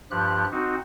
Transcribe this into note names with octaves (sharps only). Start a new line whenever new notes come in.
G2 F3 G4 F#6
C4 D#4 F#4